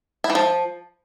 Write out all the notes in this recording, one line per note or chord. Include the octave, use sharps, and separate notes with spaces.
E4
E3
F3